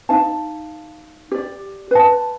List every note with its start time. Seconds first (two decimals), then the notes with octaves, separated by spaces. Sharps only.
0.09 D#4 F5 A5
1.32 G4 D5
1.91 B4 F5 A5